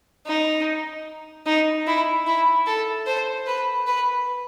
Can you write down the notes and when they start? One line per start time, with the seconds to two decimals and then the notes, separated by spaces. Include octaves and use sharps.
0.26 D#4
1.46 D#4
1.87 E4
2.27 E4
2.67 A4
3.06 C5
3.47 B4
3.87 B4